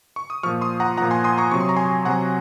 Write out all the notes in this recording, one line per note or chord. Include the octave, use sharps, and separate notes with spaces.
C#6
D#6
A#2 F3 C#6 F6
C6 D#6
F#5 A#5
A#2 F3 F#5 A#5
G#5 C6
C6 D#6
A#5 C#6
C3 F#3 C#6
C6
A#5
G#5 C6
C3 F#3 F#5 A#5